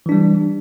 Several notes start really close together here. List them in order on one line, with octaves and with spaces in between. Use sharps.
E3 D4 G3